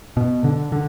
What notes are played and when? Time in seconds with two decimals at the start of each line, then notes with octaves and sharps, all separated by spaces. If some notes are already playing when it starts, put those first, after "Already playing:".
0.17 B2
0.44 D3
0.72 D3